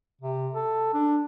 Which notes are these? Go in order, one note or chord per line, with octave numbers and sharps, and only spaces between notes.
C3
A4
D4